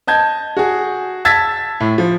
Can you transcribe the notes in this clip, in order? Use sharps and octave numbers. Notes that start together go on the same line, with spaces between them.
D#5 A5 G6 G#6
F#4 G#4
A5 E6 G#6 A6 B6
A2
F3